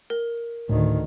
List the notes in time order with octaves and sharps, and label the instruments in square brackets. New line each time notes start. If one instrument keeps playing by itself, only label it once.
[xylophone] A#4
[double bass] D2 D#3 [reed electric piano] A2